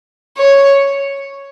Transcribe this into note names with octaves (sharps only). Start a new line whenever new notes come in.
C#5